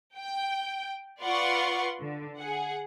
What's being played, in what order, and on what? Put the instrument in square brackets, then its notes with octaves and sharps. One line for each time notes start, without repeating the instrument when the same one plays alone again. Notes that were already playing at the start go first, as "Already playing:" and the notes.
[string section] G5
F4 B4 D5 F#5 C6 C#6
D3
G#4 F#5